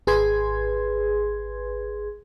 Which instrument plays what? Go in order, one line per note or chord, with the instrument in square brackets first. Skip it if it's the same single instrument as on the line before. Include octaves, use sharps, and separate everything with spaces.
[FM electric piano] G#1 G#4 B4 C6 G#6